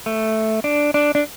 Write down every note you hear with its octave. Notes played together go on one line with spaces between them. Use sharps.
A3
D4
D4
D4